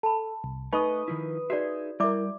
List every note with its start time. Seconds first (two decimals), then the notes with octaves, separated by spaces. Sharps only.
0.03 A4 A5 B5
0.44 C2
0.73 A3 D#4 B4 D#5 C#6 D#6
1.08 D#3 F3 E4
1.50 D#4 F#4 G#4 D5 E5
2.00 G3 E4 A#4 D5 E5 D6